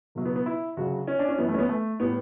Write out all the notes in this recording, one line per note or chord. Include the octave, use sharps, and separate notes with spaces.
C#2 B2 F#3
B3
B3
E4
D2 C#3 F#3 F#4
C#4
D4
C#4
F#2 E3 G3 B3
A3
C#4
B3
A3
A2 G3 B3